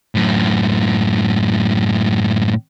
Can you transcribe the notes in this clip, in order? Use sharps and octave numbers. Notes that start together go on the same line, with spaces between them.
F#2 A2